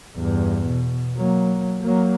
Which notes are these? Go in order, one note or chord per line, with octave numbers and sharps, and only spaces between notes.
E2 G2
B2
F#3 A#3
F#3 A#3